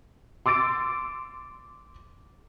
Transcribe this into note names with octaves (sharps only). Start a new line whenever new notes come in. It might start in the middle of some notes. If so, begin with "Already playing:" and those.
C6 D6 E6 A6 D7